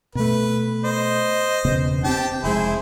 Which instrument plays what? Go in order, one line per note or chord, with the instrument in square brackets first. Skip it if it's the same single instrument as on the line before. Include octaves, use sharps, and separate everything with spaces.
[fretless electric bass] B2 A3 [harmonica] B4
[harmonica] C5 D#5
[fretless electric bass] E1 C#3 B3
[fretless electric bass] C4 C#4 [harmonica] G4 G5 A5
[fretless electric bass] F1 G#3 [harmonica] E4 G#4 C5